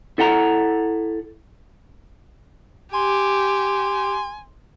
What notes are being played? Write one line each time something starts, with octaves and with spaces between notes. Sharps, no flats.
E4 A4 F#5 G5 A#5
G4 G#5 C6